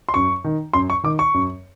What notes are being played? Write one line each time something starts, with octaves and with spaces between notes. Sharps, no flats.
C6
F#2 C#6
D#3
F#2 C6
C#6
D#3 D6
C#6
F#2